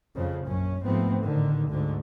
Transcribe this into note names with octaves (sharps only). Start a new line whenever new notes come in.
F2 C#3 F3
A#1 F#2 C#4
G#2 F3 A3 B3 C4
A1 D3 D#3
D2 G#2 D3